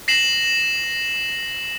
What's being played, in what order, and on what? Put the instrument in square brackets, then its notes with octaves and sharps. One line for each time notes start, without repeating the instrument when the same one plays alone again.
[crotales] A#6 C7 E7 F#7